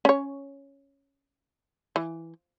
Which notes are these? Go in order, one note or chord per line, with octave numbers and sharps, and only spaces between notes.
C#4 C#5
E3